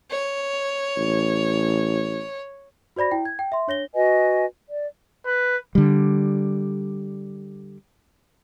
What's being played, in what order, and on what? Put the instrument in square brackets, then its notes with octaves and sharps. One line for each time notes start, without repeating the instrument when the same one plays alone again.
[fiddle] C#5
[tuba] A1
[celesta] F#4 C5 D5 B5 A#6
E4 G5
G#6
G5
E5 C6
D4 C#5 A#6 G7
[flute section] F#4 B4 D#5 G#5
D5
[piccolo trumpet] B4
[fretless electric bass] D3 G3